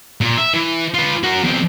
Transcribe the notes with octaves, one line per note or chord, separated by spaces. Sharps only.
A#2
E5
E3
F4 B4
F#4 A#4
E2 C4